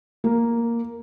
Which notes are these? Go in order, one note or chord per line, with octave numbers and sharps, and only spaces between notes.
A#3